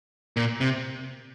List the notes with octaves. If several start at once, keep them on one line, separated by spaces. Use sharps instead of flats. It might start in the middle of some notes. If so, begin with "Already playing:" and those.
A#2
C3